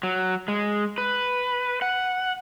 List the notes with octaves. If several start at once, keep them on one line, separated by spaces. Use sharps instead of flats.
F#3
G#3
B4
F#5